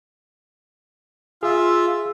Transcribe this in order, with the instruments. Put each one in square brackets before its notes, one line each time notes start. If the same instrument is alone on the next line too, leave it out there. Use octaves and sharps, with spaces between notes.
[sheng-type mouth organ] F4 [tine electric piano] G#4 [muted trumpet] E5